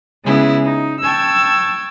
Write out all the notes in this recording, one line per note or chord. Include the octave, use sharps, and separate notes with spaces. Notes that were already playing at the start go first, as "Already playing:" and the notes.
C#3 G#3 B3 E4 G#4
D#4
G5 A5 C#6 E6 G#6